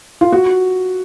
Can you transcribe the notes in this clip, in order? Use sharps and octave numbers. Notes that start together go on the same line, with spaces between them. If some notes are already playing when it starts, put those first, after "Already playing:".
F4
F#4